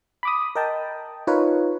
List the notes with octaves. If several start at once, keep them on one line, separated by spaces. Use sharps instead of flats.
B5 D6 D#6
A#4 D#5 G5 A5
D#4 F4 A#4 B4 C#5